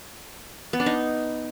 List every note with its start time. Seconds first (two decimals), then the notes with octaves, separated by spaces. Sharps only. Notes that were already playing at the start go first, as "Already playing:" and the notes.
0.73 B3
0.80 D4
0.86 D#4